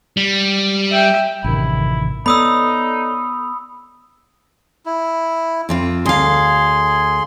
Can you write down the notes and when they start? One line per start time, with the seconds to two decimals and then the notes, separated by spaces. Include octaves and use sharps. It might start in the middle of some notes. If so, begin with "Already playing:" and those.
0.17 G3
0.90 E5 G5
1.44 A1 F#2 C3 D#3 E4
2.26 B3 D#4 A4 C#5 D5 B5 D#6 E6
4.86 E4
5.69 F2 C4 F4
6.05 D2 G#4 F5 C6